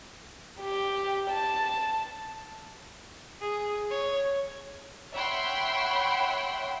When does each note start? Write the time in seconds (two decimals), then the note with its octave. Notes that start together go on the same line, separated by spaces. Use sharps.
0.60 G4
1.31 A5
3.41 G#4
3.91 C#5
5.15 C#5 E5 F#5 G5 B5 C6